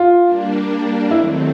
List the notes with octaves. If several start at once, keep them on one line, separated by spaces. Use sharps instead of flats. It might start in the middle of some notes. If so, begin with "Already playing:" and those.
Already playing: F4
G3 A#3 D4
D#2 D#3 F#3 A3 C4 E4